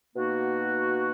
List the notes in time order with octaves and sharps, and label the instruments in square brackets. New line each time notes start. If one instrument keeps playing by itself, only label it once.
[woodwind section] B2 A#3 D#4 F#4